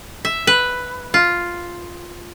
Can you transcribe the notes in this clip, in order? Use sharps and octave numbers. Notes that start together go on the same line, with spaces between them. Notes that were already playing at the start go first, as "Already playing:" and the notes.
E5
B4
F4